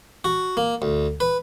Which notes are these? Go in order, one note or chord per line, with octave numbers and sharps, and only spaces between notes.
F#4
A#3
D2
B4